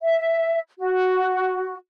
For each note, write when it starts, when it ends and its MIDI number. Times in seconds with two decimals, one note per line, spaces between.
0.02 0.59 76
0.78 1.76 66